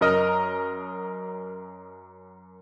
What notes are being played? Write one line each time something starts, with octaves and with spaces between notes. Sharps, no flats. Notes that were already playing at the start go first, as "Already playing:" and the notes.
F#2 A#4 D#5 A#5 F6